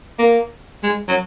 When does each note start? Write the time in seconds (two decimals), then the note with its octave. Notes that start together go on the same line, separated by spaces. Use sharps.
0.19 A#3
0.83 G#3
1.08 F#3